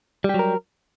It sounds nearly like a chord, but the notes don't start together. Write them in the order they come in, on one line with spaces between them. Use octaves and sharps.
G3 G4 F#3 A#4